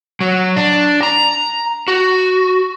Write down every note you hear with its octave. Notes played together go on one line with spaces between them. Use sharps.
F#3
D4
A#5
F#4